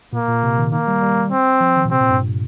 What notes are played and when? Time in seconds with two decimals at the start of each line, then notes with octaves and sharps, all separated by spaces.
0.13 A#2 A#3
0.28 A#2
0.43 C3
0.58 D#3
0.72 D#3 A#3
0.87 G3
1.02 G3
1.32 C4
1.60 F3
1.76 D#3
1.85 A#2
1.90 C3 C4
2.00 A#2
2.10 G2